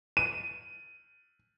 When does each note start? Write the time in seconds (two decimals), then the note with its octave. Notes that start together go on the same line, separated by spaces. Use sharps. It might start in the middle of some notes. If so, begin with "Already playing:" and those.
0.17 D#7